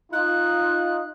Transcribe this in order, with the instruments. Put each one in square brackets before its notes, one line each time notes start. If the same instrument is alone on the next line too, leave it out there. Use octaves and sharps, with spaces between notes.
[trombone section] D#4 F4 [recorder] F#6